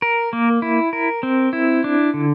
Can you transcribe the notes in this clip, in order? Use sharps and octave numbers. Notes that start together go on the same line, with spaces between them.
A#4
A#3
E4
A#4
C4
E4
D4
D3